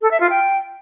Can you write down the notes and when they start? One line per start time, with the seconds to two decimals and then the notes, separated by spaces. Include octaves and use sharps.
0.02 A4
0.11 E5
0.20 F4
0.30 G5